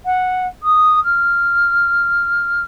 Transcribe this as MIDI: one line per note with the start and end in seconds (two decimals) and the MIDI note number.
0.05 0.47 78
0.63 1.03 87
1.04 2.64 89